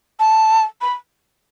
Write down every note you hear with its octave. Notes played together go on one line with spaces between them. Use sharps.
A5
B5